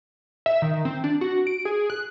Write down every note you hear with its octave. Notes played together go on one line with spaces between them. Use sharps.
E5
D#3
C4
D4
F#4
D7
G#4
F#6